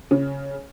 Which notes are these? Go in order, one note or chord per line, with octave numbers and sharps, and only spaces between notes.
C#3